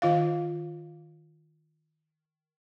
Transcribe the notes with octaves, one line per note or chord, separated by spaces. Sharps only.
D#3 F4 D#5 F5